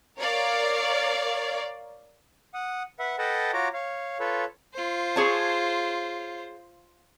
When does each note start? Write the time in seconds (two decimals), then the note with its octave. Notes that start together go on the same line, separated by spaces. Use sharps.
0.19 A#4 C#5 D5 F5
2.54 F#5 D#6
2.99 B4 E5 F#5
3.19 A4 B4 D#5 F#5 G5 A5
3.53 F4 F#4 C#5 A#5 D6
3.73 C#5 F5
4.20 F4 A4 B4 C#5
4.74 F4 C5
5.16 G#4 C#5 A5